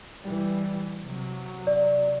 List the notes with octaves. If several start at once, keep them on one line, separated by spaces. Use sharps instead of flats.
E3 G3
C3 F#3
D5